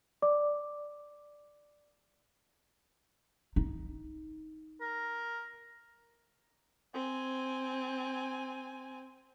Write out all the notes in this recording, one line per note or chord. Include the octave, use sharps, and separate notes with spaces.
D5 D6
D#4
A#4
C4 G#5